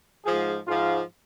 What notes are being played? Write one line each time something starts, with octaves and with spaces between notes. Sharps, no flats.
G#2 F3 G#4
G#2 F3 F4